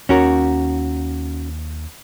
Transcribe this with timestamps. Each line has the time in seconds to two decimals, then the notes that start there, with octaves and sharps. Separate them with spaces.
0.09 D#2 C#4 F#4 A#4